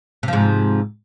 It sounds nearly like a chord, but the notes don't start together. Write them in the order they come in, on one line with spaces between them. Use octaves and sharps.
C3 F3 G#2